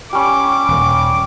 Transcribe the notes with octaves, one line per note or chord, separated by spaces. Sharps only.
G3 C#4 D6
D#1